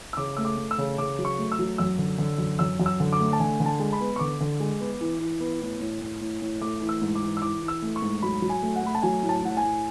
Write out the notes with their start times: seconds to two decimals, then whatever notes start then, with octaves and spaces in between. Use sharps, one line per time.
0.13 E6
0.17 C#3 D6
0.37 A3 E6
0.45 D6
0.57 A3
0.71 E6
0.78 C#3
0.98 C#3 D6
1.19 F#3
1.25 C#6
1.39 A3
1.52 E6
1.59 F#3
1.78 F#2 E6
1.98 D3
2.18 D3
2.38 F#2
2.59 F#2 E6
2.80 F#2
2.86 E6
3.00 D3
3.13 D6
3.20 A3
3.33 A5
3.40 D3 G#5
3.60 D3
3.66 A5
3.79 G#3
3.93 B5
4.01 B3
4.16 C#6
4.19 D3 D6
4.40 D3
4.60 G#3
4.80 B3
5.01 E3
5.20 E3
5.40 B3
5.61 A2
5.80 A2
6.02 A2
6.21 A2
6.42 A2
6.61 A3 D6
6.81 E3
6.89 E6
7.02 G#2
7.15 D6
7.22 E3
7.37 E6
7.42 E3 D6
7.62 E3
7.68 E6
7.82 A3
7.96 C#6
8.02 G#2
8.23 F#3 B5
8.42 F#3
8.50 G#5
8.63 A3
8.76 F#5
8.83 A3 B5
8.95 A5
9.03 F#3 G#5
9.23 A2
9.29 A5
9.42 A2 F#5
9.57 G#5
9.63 A2